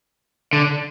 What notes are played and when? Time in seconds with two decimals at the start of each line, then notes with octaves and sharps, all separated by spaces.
0.53 D3